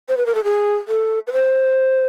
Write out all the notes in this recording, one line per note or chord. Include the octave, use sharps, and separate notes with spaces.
C5
B4
A#4
A4
G#4
A4
B4
C5